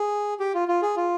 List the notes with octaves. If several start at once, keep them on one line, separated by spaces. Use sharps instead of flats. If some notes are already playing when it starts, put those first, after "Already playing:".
Already playing: G#4
G4
F4
F4
G#4
F4